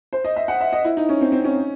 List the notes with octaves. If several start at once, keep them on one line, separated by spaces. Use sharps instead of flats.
C5
D#5
E5
F#5
E5
D#5
E4
D#4
C#4
C4
C4
C#4